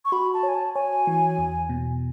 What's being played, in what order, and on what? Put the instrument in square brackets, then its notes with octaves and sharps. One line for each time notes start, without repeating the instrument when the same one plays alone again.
[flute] C#6
[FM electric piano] F#4 [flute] B5
[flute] A5
[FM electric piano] C#5 [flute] G#5
[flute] A5
[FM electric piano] C#5 [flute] G#5
[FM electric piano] E3
E2
B2